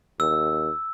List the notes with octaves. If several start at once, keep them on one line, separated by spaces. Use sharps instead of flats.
D#2 E6